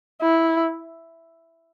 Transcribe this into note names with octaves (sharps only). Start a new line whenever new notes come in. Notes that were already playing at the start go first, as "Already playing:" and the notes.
E4